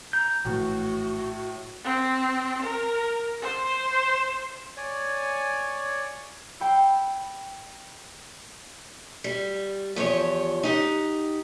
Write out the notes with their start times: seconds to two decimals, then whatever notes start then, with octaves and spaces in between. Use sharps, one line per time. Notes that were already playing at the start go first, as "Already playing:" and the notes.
0.13 A#5 G6
0.45 A#1 A2 E3 A3 F#4
1.84 C4
2.62 A#4
3.42 C5
4.77 C#5 D5 G#5
6.60 G5 B5 E6 C7 C#7
9.24 G3
9.96 E2 F3 G4 C#5
10.63 D#4 G4 F#5